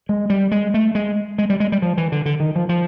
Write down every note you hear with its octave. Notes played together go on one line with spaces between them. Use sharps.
G#3
G3
G#3
A3
G#3
G#3
G3
G#3
G3
F3
E3
D3
D3
D#3
F3
F3